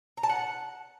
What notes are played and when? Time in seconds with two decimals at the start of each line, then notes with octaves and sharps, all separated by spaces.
0.17 A#5
0.23 A5
0.29 F#5